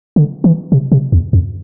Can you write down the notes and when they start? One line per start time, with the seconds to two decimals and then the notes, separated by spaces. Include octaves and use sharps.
0.16 D3
0.44 E3
0.72 C3
0.92 C3
1.12 E2
1.33 F2